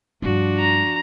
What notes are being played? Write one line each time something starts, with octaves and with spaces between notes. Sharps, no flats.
G2 F3 G3 D4 F#4
A#5